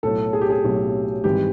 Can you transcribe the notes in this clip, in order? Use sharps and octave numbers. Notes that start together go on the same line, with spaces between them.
B1 A2 F#3 A4
G#4
G4
G#4
B1 A2 F#3
G#1 G#2 E3 G3 G4